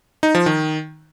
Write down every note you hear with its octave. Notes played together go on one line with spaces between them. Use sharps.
D#4
F3
D#3